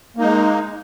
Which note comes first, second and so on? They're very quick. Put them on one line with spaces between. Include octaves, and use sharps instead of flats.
A#3 D#4 G#3